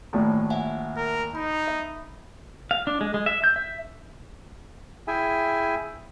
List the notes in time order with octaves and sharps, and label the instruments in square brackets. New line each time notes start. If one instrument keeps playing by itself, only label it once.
[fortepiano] A#1 D#2 A2
[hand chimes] E5 F#5 G#5
[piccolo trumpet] A#4
[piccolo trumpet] D#4 [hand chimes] B5
[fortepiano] E5
[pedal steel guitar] F5
D4
G#3
G#3
E5
G6
E5
[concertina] E4 G#4 E5 G5 G#5